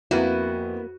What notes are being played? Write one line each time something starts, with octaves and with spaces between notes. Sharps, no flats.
F2 A#3 B3 E4 F#4 B4 D#7